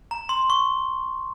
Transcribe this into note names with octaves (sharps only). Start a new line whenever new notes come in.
A#5
C6
C#6